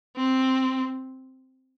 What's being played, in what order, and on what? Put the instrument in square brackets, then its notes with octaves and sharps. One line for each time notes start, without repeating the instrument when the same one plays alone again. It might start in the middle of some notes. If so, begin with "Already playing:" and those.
[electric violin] C4